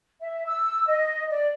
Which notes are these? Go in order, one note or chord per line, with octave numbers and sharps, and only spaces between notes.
E5
E6
D#5
D5